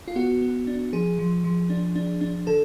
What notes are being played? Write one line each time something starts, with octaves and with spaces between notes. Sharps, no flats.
F4
B3 F#4
B3
D4
F3 G#4
F3
F3
D4
D4
D4
D3 A4